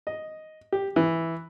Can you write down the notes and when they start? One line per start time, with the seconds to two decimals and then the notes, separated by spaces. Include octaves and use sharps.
0.07 D#5
0.73 G4
0.96 E3